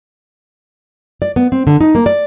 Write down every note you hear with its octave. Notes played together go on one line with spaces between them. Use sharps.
D5
B3
C4
D3
D#4
A#3
D5